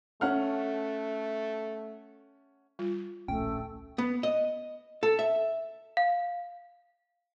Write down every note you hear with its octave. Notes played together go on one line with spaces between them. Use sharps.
A3 C#4 F#5 F6
G3 F4
D1 A#1 A3 C#4 G5
B3
D#5
A4
E5
F5